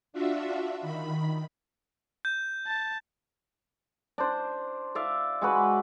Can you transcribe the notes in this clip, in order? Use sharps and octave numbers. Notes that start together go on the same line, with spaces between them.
D4 F4 F#4 E5
D#3 B5
G6
A5
D4 C5
D5 E5 F5
G#3 F#4 B4